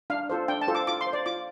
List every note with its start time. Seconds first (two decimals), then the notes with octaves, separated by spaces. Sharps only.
0.10 D4 F5
0.29 F4 A4 C5
0.48 D4 G5
0.61 A5
0.68 F4 A4 C5
0.75 D6
0.87 F4 D6
1.01 C6
1.07 C5
1.13 D5
1.26 F4 D6